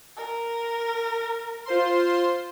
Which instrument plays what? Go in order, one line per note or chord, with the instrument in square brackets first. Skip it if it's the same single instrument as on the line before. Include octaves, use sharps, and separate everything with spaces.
[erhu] A#4
[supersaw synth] F4 C5 C6